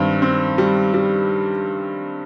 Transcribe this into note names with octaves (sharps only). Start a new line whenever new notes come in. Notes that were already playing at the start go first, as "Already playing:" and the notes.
Already playing: G2 D#3 C4
C4
G3
G3